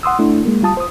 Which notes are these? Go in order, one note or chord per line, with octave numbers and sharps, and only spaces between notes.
F#5 C6 D#6 E6
A3 D4 E4
G#3 A#3
G3 F4 A5 D#6
C5 D#6